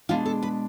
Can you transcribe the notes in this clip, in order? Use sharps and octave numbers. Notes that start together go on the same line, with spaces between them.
B2 G#3 D4 F4
A4
B4